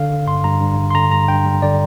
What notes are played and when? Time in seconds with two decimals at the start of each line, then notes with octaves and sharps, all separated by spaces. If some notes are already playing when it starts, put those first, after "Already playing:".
Already playing: D3 F5
0.10 D3
0.27 G2 C6
0.44 G2 A#5
0.61 G2
0.78 G2
0.91 C6
0.95 D3 A#5
1.11 G2 A#5
1.28 G2 G5
1.46 G3
1.62 D3 D5